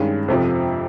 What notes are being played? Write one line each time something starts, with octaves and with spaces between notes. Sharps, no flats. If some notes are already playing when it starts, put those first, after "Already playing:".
Already playing: G2 D#3 G#3 C#4
F2 C3 F3